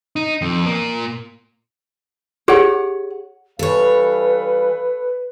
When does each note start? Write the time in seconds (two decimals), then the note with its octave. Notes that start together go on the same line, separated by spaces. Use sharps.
0.16 D#4
0.41 F2
0.66 A#2 A#3
2.48 G4 G#4 C#5 F#5
3.59 E3 G3 A4 B4 C#5 F5